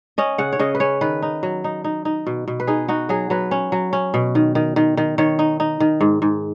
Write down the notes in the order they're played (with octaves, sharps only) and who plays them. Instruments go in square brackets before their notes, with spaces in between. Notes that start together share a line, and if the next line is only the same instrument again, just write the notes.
[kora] C#4 D#5
C#3 F#5
C#5
C#3 D#5
B4
C#4 C#5
D#3 B4
D#4
F#3
D#4
D#4
D#4
B2
B2
B4
D#4 G#4
D#4 F#4
F#3 G#4
F#3 B4
C#4
F#3
C#4
B2
D#3
D#3
D#3
D#3
D#3 C#5
D#4
D#4
D#3
G#2
G#2